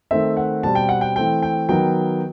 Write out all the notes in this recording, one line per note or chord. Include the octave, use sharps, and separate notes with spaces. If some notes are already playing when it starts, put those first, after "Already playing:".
D#3 A3 C4 E5
F#5
B2 G3 C4 A5
G5
F#5
G5
E3 A3 C4 G5
G5
D#3 F#3 B3 G5